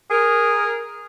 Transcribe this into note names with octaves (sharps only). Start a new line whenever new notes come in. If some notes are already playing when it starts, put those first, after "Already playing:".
G#4 A#4